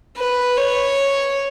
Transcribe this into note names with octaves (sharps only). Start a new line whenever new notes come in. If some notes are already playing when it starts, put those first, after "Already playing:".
B4
C#5